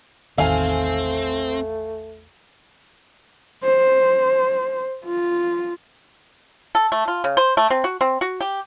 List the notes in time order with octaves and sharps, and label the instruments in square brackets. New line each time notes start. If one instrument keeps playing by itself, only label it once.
[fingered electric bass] A1 E2 D#3 [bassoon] A3 [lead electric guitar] C4 [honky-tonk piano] F5 G#5
[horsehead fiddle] C5
F4
[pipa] A4
A3
F4
C#3
C5
A3
C4
F#4
C4
F#4
G4